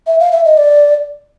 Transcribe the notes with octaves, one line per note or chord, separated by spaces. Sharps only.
E5
F5
E5
D#5
D5